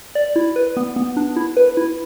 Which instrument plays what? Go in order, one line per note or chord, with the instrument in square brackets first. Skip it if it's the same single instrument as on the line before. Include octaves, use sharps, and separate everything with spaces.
[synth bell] D5
E4
B4
B3
B3
D4
E4
B4
E4